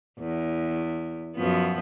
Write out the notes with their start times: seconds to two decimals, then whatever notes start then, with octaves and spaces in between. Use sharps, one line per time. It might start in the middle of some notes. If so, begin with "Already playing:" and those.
0.19 E2
1.36 F#2 F3 B3